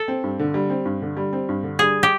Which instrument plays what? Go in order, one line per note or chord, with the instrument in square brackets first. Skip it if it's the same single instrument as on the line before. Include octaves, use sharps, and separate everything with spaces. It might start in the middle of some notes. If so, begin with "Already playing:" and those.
Already playing: [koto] A4
[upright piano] C4
G2
D3
G3
C4
G2
D3
G3
C4
G2
D3
[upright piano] G3 [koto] G#4
[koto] G4